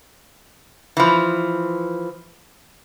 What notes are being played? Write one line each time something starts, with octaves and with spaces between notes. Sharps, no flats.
E3 F3